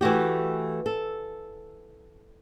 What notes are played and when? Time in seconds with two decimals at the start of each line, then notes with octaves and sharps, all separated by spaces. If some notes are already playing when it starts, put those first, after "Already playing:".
0.01 E3 A3 F#4 G4
0.86 A4